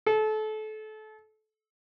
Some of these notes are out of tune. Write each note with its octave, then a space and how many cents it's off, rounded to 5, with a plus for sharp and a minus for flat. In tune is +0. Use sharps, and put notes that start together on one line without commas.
A4 -30